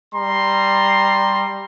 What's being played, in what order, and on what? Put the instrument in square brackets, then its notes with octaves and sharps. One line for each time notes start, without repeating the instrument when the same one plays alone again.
[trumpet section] G3 A#5 C6